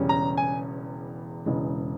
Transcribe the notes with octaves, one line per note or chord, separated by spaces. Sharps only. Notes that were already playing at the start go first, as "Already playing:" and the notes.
Already playing: E1 E2 C#3 G3 C#4
A#5
G#5
E1 E2 C#3 E3 G#3